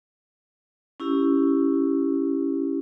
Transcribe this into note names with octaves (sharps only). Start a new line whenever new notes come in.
C#4 E4 G4